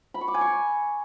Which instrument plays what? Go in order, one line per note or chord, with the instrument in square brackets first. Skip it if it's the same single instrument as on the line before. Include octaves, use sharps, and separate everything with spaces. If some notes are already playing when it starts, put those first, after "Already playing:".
[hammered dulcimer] B5
C#6
D6
G#5
C#6